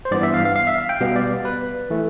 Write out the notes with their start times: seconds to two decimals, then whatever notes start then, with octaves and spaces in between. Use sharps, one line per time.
0.05 C5
0.11 G2 E3 B3 D5
0.23 E5
0.34 F5
0.45 F5
0.56 F5
0.67 E5
0.78 F5
0.89 G5
1.00 B2 G3 B3 F5
1.16 D5
1.45 B4
1.90 E3 A3